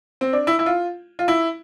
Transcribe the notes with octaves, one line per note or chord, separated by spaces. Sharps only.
C4
D4
E4
E4
F4
F4
E4